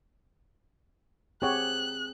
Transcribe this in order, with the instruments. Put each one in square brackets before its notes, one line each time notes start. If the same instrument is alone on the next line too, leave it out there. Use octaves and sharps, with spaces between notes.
[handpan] C4 G#4 [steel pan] G4 C#5 F#5 [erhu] F#6